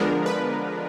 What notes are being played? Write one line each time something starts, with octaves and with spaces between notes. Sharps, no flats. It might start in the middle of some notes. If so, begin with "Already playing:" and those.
Already playing: D3 F3 G#3 B3 D4 A#4
B4